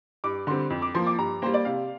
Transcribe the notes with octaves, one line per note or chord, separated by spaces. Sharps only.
G2 D6
D3 G3 C4 C6
F2
D6
F3 A#3 C6
D6
G2 A#5
G3 A#3 C5
D5
C3 F5